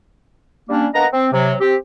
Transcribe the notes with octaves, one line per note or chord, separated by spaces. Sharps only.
G3 A#3 C#4 D4
A#3 B3 D4 D#5 F#5 A#5
C4
C3 F#3
C4 G4